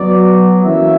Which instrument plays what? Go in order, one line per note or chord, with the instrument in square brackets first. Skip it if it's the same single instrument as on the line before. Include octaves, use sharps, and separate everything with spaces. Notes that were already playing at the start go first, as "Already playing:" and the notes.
Already playing: [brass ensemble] F#3 B3 F#4 [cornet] D5
[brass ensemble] E3 A#3 C#4 F#4 [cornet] E5